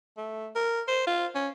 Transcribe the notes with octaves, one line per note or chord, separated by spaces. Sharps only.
A3
A#4
C5
F4
C#4